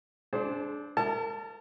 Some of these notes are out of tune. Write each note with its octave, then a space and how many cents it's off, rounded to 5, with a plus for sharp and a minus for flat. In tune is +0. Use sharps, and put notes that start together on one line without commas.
D4 -5 G#4 +40 C5 +0
A#4 -40 A5 +0